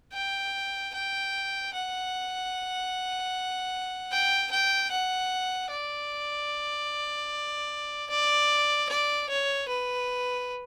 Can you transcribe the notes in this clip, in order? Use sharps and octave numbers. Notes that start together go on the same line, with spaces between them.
G5
G5
F#5
G5
G5
F#5
D5
D5
D5
C#5
B4